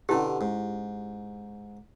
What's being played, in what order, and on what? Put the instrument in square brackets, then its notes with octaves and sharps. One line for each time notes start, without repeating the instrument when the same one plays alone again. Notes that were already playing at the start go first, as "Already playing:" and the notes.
[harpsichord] B2 D3 [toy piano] C#4 E4 G4
[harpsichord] G#2